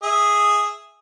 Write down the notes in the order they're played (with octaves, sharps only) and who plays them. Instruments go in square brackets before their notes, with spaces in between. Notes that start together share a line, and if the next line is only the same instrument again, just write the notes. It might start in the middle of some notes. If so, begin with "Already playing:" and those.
[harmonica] G#4 E5